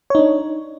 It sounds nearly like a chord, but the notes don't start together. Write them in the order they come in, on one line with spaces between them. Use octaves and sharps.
C#5 D#4 D4